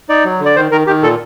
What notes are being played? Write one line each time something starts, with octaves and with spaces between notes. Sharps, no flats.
D#4 D5
F#3
D3
D5
D#3 C5
D#3 A#4
D#3 G4
A#2 A4